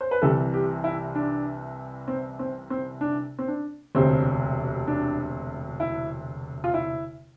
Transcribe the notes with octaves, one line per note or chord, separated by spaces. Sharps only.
C5
B4
C2 C3 E3 A4
G4
E4
D4
C4
C4
C4
D4
C4
D4
E1 D2 C3 C4
D4
E4
F4
E4